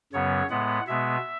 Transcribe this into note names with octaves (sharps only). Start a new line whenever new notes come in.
F#2 C#3 F#3 B3 C#5
A2 G#3 B3 F#5
B2 G#3 B3 E5